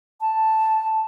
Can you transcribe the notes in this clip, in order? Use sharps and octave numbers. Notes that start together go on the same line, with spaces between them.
A5